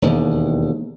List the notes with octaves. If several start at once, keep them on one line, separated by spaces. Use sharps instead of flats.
E1 D#2